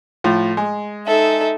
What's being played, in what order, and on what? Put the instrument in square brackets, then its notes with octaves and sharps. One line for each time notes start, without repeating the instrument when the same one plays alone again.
[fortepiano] A2 F3 F4
G#3
[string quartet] D#4 A4 E5